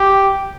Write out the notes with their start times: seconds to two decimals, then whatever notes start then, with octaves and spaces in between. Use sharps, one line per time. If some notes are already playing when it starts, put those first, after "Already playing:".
Already playing: G4